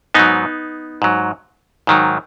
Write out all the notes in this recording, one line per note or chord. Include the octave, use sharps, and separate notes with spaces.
G#2 F#3 B3 D#4
G#2 F#3
G#2 D#3 F#3